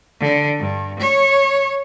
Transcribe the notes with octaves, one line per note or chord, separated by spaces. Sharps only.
D3
G2
C#5